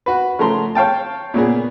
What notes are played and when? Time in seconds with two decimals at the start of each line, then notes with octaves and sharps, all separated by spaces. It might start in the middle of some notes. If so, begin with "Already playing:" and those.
0.06 F#4 B4
0.39 C#3 F3 A3 A#5 C6
0.75 C#5 F5 G5 A5
1.34 A#2 C#3 B3 G#4